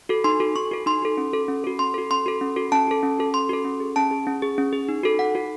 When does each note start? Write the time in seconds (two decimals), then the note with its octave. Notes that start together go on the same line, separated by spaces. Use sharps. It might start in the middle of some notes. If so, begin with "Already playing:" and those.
0.09 F#4 A4
0.24 D#4 C6
0.40 F#4 A4
0.56 D#4 C#6
0.71 F#4 A4
0.86 D#4 C6
1.02 F#4 A4
1.17 C#4
1.33 F#4 A4
1.48 C#4
1.64 F#4 A4
1.79 C#4 C6
1.94 F#4 A4
2.11 C#4 C6
2.26 F#4 A4
2.41 C#4
2.56 F#4 A4
2.72 C#4 A5
2.87 F#4 A4
3.03 C#4
3.19 F#4 A4
3.34 C#4 C6
3.49 F#4 A4
3.65 C#4
3.80 G#4
3.96 C#4 A5
4.11 G#4
4.27 C#4
4.42 G#4
4.58 C#4
4.73 G#4
4.89 D#4
5.04 F#4 A4
5.19 D#4 F#5
5.35 F#4 A4